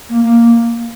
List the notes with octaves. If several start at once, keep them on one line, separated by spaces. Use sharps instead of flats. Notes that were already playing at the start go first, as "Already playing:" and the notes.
A#3
A#3